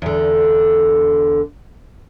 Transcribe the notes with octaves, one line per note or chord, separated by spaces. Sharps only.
E2 D3